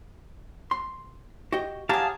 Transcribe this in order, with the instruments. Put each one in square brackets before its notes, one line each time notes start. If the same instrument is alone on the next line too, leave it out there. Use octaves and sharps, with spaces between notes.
[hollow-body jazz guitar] C6
F#4 G4 D#5
[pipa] F#3 G#4 [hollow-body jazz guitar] G4 [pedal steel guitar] F5 A5